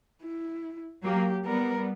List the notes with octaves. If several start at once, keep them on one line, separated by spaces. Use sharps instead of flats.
E4
F#3 A#3 G4
G3 B3 A#4